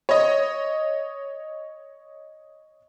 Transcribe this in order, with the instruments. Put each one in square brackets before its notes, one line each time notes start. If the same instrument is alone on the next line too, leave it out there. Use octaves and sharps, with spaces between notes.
[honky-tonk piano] C#5 D#5